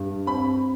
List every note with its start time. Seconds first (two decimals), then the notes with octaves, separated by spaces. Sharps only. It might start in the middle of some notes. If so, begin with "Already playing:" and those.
Already playing: G2
0.27 C4 B5